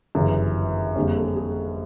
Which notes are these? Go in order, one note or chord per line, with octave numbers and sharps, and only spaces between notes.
G1 F#2 C#3 E3
F2 D3 G3 A#3 G#4
G4
A4
G#4
G#4